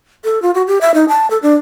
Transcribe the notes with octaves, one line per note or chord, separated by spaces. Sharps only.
A4
F4
F#4
G4
E5
D#4
A5
A4
D4